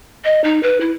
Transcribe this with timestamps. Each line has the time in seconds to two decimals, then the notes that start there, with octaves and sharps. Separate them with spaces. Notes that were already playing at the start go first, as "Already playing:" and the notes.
0.25 D#5
0.44 D#4
0.63 B4
0.81 E4